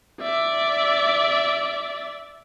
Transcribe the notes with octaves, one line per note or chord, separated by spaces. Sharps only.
D5 E5